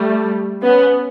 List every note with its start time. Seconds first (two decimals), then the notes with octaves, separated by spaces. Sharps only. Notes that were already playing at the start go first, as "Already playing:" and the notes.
Already playing: G3 A3
0.62 B3 C#4